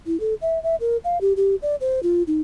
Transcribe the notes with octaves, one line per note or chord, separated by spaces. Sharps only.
E4
A4
E5
E5
A#4
F5
G4
G4
D5
C5
F4
D#4